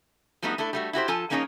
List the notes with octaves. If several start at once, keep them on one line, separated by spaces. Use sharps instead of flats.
F3 G3 A3 B3 D#4 F#4
A3 D4 E4 A4
G3 A3 F#4
E4 F#4 G4 C5
F3 F4 A4 G#5 A5
F3 A#3 C#4 D#4 G#4 C#5